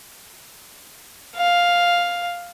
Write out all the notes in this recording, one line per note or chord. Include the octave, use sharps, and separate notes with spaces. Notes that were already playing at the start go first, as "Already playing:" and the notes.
F5